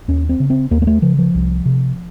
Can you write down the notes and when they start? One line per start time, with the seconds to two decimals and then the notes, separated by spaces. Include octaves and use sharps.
0.08 D#2 C#4
0.29 C4
0.40 C#3
0.50 C4
0.71 D#2 A#3
0.82 A#3
0.87 A3
1.02 C#3 F3
1.19 F3
1.34 C2
1.65 C3